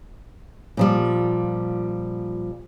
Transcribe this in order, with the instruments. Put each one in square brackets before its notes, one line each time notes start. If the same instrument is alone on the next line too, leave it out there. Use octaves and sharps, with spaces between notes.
[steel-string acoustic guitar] A#2 F3 G3